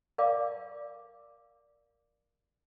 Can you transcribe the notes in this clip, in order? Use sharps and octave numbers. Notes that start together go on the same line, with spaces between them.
A#4 D5 F5 D6